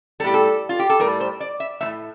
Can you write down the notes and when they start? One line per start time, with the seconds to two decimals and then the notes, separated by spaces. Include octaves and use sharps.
0.20 G3 A4
0.24 A2 G4
0.34 A4
0.69 F4
0.79 G4
0.89 A4
1.00 A2 G3 A#4
1.20 C5
1.40 D5
1.60 E5
1.80 F3 A3 E5
1.85 A2